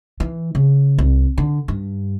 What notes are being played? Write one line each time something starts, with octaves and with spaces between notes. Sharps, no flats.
E3
C#3
C2
D3
G2